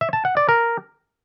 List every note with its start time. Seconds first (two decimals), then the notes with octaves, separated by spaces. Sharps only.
0.01 E5
0.13 A5
0.25 F#5
0.37 D5
0.49 A#4